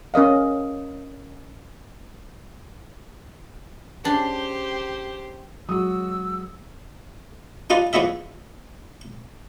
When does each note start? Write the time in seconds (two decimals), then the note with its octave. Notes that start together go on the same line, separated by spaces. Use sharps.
0.14 C#4 A#4 D#5 F5
4.04 C#3 D4 G4 C5
5.69 F#3 G#3 F#4 D#6 E6
7.70 D4 D#4 F4 B4 D5
7.93 E2 F3 B3 E4 D#5 E5